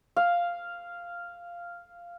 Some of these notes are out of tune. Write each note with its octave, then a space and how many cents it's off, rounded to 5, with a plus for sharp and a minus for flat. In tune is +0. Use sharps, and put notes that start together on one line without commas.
F5 -5